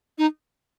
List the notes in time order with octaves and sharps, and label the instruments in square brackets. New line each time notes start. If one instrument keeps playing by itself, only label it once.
[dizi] D#4